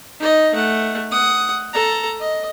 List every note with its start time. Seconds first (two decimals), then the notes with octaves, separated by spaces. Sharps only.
0.20 D#4 D#5
0.54 A3 F#5
1.11 F#5 D#6
1.73 A4 A#5
2.20 D#5